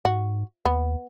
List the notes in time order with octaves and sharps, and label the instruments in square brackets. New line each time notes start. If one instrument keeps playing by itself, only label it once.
[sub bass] G#2 [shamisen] F#4
[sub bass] D#2 [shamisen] B3